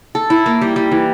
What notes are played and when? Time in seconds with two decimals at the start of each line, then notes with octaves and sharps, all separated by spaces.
0.15 A4
0.30 E4
0.46 A#3
0.61 G3
0.76 G3
0.91 E3